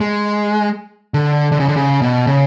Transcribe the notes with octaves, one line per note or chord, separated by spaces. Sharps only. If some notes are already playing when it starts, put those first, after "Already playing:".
G#3
D3
D3
C#3
D3
C#3
B2
C#3